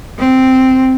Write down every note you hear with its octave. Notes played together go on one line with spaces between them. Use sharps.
C4